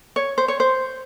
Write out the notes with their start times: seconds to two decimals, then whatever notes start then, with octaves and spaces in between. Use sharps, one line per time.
0.16 C#5
0.38 C5
0.48 C#5
0.60 C5